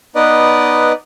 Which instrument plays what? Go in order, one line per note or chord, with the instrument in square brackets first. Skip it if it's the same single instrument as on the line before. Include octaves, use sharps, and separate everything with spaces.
[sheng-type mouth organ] B3 D#4 B4 D5 D#5